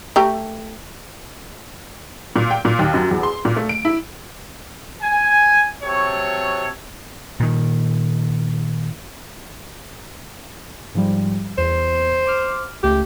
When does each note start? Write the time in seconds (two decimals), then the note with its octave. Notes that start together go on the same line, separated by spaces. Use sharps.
0.16 A3 G4 A#5
2.36 A#2
2.51 G5
2.65 A#2
2.79 D#2
2.94 F#2
3.11 E2
3.23 C6
3.45 A#2
3.56 A3
3.69 D7
3.85 E4
5.02 G#5
5.83 C3 F#3 A4 C#5
7.40 A#2 D#3
10.95 G#2 F3 G3
11.58 E2 C5
12.27 D6 F6
12.83 C#2 A3 G4